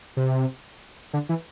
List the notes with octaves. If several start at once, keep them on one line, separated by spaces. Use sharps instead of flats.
C3
D3
E3